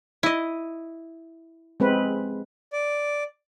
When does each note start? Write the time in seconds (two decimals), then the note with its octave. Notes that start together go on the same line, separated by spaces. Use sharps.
0.23 E4 D#5
1.80 G#3 C4 B4
2.73 D5